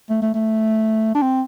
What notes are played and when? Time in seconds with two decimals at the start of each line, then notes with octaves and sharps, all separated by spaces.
0.10 A3
0.22 A3
0.34 A3
1.15 D4
1.22 C4